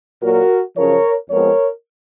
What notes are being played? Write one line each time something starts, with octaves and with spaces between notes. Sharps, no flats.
A#2 F#3 A#3 F#4 A#4
F#2 C#3 F3 A#4 C#5
F2 F3 G#3 B3 A#4 C#5